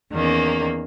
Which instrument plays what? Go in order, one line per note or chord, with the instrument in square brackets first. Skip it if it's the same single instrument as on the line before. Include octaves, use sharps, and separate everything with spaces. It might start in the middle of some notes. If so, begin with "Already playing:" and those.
[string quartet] E2 D#3 A#3 C#4